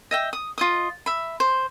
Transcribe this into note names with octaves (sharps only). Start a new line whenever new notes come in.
D#5 E5 G5
D#6
F4 D#5 D#6
E5 B5
C5